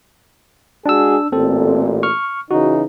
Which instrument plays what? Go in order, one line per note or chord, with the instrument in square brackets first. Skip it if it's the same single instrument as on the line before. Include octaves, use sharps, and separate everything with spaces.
[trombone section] G#3 F#4 G#4 [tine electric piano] D4 E6
[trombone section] A1 A#2 [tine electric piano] C4 A4
[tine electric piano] C#6 F6
[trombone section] C#3 E3 D#4 [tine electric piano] F#4